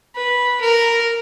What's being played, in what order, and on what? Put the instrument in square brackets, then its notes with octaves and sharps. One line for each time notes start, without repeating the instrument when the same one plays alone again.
[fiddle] B4
A#4